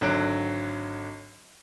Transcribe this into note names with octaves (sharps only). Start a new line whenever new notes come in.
G#1 D3 F#3 F#6 D7